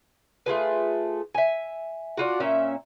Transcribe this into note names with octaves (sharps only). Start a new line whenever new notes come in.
A3 F4 G#4 B4
E5 G#5
D4 F4 F#4
A#2 C#4 E5